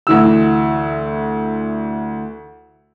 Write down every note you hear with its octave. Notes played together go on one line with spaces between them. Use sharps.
D2 E3 E6